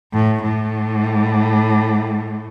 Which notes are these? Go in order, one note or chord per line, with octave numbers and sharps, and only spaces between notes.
A2
A2